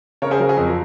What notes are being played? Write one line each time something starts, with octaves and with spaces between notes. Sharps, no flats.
C#3 A#4 C#5
G#4 C5
F#3 A#4
G#4
F2 A#4